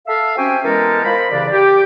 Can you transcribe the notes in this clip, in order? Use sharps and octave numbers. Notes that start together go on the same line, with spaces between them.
A4 E5 F5
C4 C#4 F#4 G4 G5 G#5
E3 G#3 B3 G4 A4 A#4
F4 A#4 C5 B5
C2 C#3 E3 D4 G4 D5
G4